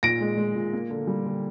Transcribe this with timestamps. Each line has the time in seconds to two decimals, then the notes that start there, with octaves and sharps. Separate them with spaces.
0.03 A#2 A#6 D7
0.21 G#3
0.38 G#3
0.55 A#2
0.73 A#3
0.90 D3
1.07 G3
1.26 D3